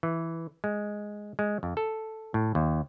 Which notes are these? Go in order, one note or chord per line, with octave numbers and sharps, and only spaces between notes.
E3
G#3
G#3
F2
A4
A2
D#2